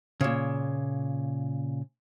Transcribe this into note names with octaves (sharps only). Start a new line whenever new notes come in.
A#2 C#3